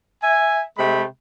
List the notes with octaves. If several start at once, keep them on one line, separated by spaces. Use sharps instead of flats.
E5 G#5
C3 G#3 A3 G5 B5